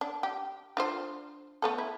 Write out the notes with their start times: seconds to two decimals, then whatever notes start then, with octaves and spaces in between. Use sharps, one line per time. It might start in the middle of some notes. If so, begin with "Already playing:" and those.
0.01 D4
0.23 G4
0.77 D4 F4 C5
1.62 A3 B3 A4
1.78 E4